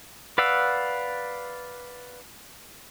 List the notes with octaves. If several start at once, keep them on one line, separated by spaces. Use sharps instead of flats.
B4 D5 F5 F#5 E6